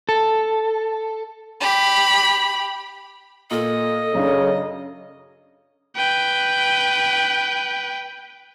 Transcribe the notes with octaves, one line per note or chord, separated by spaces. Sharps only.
A4
G4 B5
A#2 A4 D#5
F#2 C#3 D4
B4 G5